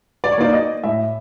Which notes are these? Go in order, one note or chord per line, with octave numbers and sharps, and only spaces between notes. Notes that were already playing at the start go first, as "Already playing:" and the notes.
D5
C#5
A#3 D#4 D5
D#5
A2 E5